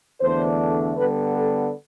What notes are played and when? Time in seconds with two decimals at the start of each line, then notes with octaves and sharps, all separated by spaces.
0.21 E2 D3 A3 D4 C5
0.96 D3 G3 B3 B4
1.33 A4